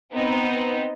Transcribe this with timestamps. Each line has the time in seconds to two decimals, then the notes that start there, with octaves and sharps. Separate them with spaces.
0.14 B3 C4 D#4